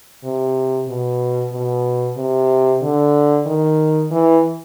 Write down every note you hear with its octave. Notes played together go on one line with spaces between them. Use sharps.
C3
B2
B2
C3
D3
D#3
E3